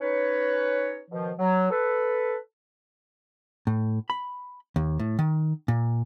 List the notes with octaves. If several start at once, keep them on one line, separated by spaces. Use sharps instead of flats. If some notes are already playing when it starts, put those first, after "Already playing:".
C#4 D#4 B4 C#5
B2 D#3 F3
F#3
A4 B4
A2
B5
D#2
A2
D#3
A#2